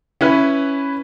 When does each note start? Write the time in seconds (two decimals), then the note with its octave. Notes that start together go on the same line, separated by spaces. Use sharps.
0.21 C#4 E4 B4